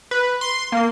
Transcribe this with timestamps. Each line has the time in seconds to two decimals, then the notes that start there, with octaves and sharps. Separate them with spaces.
0.11 B4
0.41 C6
0.72 A#3